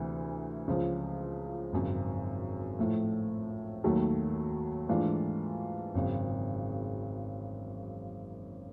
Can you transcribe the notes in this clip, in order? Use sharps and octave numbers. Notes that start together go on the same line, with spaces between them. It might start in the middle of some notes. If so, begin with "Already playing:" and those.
Already playing: D2 C3 E3
C#2 C#3 F3
G#1 F#2 C#3
A2 F3 A3
D#2 D#3 F#3 A3
G#2 E3 A3 D4 F4
G#1 F#2 C#3